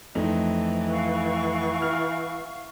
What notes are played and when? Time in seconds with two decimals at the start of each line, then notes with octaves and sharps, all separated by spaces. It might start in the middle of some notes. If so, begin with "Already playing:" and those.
0.15 F2 E3 A3 D#4
0.90 F5 F#5 C#6
1.82 E4 F6